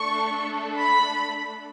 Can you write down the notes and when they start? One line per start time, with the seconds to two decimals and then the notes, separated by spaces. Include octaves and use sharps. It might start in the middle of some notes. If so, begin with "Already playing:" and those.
Already playing: A3 D4 A4 C#6
0.78 B5